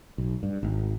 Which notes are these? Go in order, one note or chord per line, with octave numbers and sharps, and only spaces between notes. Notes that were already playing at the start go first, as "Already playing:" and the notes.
B1
G2
G#1